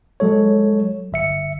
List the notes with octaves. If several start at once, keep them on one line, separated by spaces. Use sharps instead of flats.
F#3 G#3 A4 C#5
G1 E5 C#7